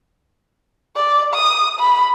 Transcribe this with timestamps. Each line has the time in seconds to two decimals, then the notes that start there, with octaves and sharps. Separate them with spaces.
0.96 D5
1.34 D#6
1.79 B5